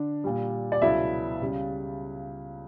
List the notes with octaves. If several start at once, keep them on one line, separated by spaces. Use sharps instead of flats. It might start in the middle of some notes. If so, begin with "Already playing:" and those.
Already playing: D3 D4
A#2 G3
D5
C#2 B2 F#3 E4 E5
C#2 C#3 G3